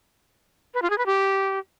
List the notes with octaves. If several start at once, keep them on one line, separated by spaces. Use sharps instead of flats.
B4
F4
G#4
B4
G4